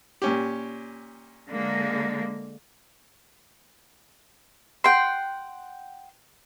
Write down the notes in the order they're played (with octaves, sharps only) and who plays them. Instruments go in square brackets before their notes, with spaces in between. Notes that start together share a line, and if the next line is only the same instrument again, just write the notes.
[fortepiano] A#2 C#4 G4
[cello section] D3 G#3 A#3
[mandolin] F#5 G5 C6